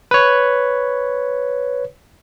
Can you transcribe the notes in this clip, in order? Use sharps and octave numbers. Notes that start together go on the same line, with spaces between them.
B4 C#5